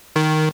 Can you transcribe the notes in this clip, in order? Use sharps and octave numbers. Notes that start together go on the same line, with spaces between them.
D#3